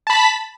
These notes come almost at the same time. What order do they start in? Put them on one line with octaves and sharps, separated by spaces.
A5 B5 B6